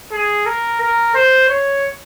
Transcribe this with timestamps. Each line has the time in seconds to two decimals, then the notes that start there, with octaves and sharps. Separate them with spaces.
0.12 G#4
0.46 A#4
0.80 A#4
1.15 C5
1.50 C#5